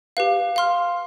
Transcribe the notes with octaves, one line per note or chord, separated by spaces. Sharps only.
G4 B4 F5
F5 C6 F6